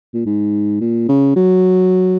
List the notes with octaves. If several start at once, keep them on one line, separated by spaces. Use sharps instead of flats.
A#2
G#2
A#2
C#3
F#3